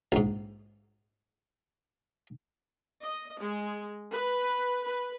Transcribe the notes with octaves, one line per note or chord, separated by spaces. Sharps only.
A#1 G#2
D#5
G#3
B4
B4